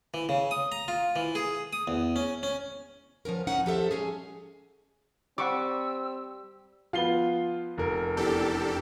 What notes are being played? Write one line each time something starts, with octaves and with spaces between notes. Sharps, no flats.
E3
C#3
D#6
A#5
F4
E3
G#4
D#6
E2
C#4
C#4
F3 B3 C#4 A#4
C#4 D#4 F#5
F3 G4 A4 E5
G#3 C#4 G#4
G3 C4 F#5 C#6 D6 E6
F3 B3 F4 C7 G7
F1 A#4
E2 D4 G4 A4